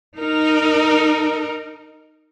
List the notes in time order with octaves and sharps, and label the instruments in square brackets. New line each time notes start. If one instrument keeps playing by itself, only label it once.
[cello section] D#4 A#4